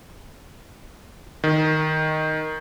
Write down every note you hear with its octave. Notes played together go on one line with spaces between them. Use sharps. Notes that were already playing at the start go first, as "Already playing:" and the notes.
D#3